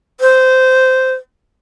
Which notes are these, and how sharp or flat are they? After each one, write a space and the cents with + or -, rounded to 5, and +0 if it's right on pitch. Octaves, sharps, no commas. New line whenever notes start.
C5 -15